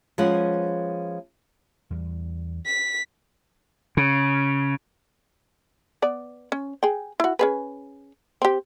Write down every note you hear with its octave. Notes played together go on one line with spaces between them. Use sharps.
F3 G#3 C#4 B4 F#5
E2 G3
B6
C#3
B3 D5
C#4
G#4 G5
E4 F#4
C#4 G#4 B4
C4 G4